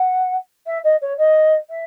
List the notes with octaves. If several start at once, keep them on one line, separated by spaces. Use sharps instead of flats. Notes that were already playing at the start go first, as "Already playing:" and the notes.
Already playing: F#5
E5
D#5
C#5
D#5
E5